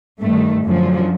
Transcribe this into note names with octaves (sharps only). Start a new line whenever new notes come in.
G2 D#3 A3
F#2 D3 F3 F#3